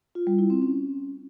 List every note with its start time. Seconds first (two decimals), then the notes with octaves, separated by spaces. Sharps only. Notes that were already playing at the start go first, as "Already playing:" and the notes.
0.15 F4
0.27 G3
0.38 E4
0.50 C4
0.62 C#4